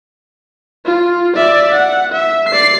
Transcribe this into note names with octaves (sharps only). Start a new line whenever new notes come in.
F4
D5 E5
F#5
E5
D5 C7